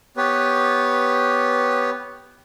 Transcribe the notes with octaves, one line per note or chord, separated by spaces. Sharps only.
B3 G4 B4 C#5